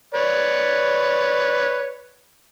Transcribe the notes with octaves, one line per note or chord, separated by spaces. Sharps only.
B4 C#5 D5